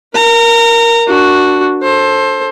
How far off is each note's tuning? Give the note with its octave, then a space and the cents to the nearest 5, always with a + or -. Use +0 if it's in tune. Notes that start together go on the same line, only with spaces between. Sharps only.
A#4 +0 A#5 -25
D4 +0 F#4 +0
A4 +0 C5 +20